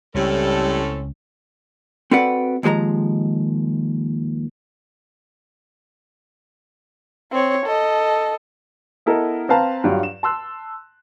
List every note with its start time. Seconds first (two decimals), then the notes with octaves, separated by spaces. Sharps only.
0.15 C#2 A2 G3 C4 C#4 A4
2.11 C4 F#4 A4 B4 D5 F#5
2.63 D#2 F3 G#3 C5 A#5
7.32 C4 C#5
7.66 A4 D#5
9.06 B3 E4 A4 A#4 D#5
9.49 C4 B4 F5 A5 A#5
9.84 G2 F#3 F4
10.03 E7
10.23 A5 C6 E6 F#6